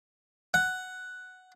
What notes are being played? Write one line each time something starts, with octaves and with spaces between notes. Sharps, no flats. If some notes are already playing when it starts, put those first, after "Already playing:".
F#5